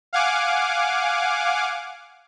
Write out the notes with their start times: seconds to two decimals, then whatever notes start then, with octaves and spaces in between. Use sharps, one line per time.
0.13 F5 F#5 G#5 D6